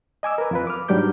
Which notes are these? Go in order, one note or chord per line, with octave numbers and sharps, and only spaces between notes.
D#5 G#5 D6 E6
A#4 B4
F2 F4 B4
D6 F6
G#2 F#3 G3 D4 D6 G6